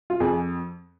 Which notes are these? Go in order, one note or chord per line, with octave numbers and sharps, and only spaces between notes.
F4
F2 G#4